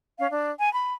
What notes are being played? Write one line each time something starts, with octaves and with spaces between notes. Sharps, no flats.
C#4 F5
D4
G#5
B5